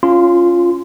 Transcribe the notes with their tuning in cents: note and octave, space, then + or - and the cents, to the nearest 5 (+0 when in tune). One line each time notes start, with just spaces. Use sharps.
C#4 +0 F4 -5 C6 -25